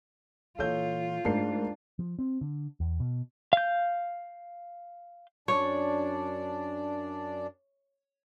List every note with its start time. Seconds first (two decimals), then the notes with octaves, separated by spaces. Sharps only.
0.59 A#2 E3 F4 A4 C#5 G6
1.25 G#2 A3 D4 A#4 C7
1.99 F3
2.19 C4
2.41 D3
2.80 E2
3.00 B2
3.53 F5 G6
5.48 F#2 D4 C#5 D5